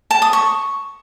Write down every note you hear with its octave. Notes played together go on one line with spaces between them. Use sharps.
A5
D#6
C#6